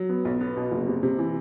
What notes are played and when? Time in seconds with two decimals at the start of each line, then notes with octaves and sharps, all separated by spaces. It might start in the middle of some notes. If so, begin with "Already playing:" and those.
Already playing: F#3
0.09 B3
0.25 B1
0.41 B3
0.57 B2
0.72 F#1
0.87 C3
1.03 C3
1.18 E3